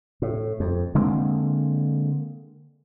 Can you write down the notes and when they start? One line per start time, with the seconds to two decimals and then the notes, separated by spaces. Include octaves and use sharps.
0.22 A2
0.60 F2
0.95 D3 G#3 A#3 C4